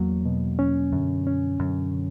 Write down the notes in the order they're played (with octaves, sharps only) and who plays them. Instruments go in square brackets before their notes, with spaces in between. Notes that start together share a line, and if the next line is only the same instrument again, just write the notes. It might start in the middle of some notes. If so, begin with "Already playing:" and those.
Already playing: [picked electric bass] E2 [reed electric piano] F#3 A#3
[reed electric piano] B2
C#4
[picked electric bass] F#2 [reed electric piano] D3
[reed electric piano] C#4
[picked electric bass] F#2 [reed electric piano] D3
[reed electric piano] D3